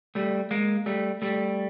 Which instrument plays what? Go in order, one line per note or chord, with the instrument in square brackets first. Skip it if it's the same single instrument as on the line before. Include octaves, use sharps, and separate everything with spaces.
[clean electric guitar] G3 A3
G#3 A#3
G3 A3
G3 A3